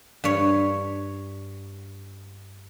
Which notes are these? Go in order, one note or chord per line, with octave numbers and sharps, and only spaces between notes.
G2 C#5